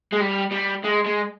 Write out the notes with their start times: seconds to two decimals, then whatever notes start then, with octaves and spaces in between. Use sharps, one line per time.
0.13 G#3
0.21 G3
0.52 G3
0.85 G#3
1.06 G#3